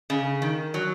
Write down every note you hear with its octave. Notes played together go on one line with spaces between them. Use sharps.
C#3
D#3
F#3